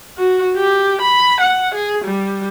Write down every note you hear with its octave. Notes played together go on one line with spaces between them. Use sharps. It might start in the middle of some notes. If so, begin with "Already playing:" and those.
F#4
G4
B5
F#5
G#4
G3